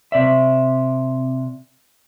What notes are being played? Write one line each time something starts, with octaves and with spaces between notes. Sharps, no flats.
C3 D5 E5